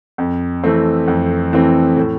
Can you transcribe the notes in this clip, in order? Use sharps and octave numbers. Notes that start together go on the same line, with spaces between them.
F2
E3 A3 C4
F2
E3 A3 C4
A2